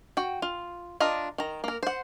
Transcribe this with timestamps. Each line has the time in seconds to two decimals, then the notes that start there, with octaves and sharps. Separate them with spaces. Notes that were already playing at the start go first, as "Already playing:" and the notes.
0.17 F#4 G5
0.42 F4
1.00 D4 F4 A#4 D#5
1.38 D#3 A#5
1.64 A#3 A#4
1.83 C5 F#5